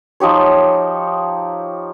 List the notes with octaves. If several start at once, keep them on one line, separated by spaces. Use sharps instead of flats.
F3 D#4 G4 C#5